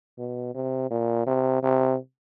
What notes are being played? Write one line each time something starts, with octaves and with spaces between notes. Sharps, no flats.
B2
C3
A#2
C3
C3